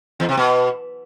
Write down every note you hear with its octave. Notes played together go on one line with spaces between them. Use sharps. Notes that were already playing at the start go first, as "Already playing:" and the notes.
E2
C3
B2